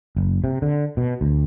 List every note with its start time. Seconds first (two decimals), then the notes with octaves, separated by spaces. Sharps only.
0.16 F#1
0.44 C3
0.62 D3
0.97 B2
1.21 D2